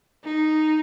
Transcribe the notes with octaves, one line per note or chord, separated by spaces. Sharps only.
D#4